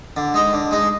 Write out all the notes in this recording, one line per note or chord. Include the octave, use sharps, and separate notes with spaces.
D3
G#3 D#4
D3
G#3 D#4